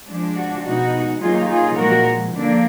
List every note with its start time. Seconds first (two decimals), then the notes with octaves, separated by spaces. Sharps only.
0.08 F3 G#3 D4
0.37 F#4
0.65 B2 G#3 D#4 F#4
1.21 D#3 F#3 A#3 D#4 F4 G#4
1.49 F4 G#4
1.77 A#2 F3 G#3 F#4 A#4
2.34 D3 F3 A#3 D4